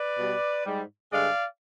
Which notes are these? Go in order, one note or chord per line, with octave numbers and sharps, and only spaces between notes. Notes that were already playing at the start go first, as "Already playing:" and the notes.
Already playing: B4 D5
B2 G3
G#2 G3
G2 D3 G#3 D5 F5